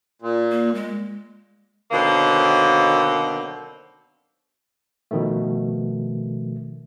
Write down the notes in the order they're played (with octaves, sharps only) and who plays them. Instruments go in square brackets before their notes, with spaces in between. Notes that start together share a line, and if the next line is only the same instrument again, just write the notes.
[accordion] A#2
[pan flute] A#3
G#3
[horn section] B2 D3 D#3 F#3 A#3 C4
[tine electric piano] B2 D#3 F3 A3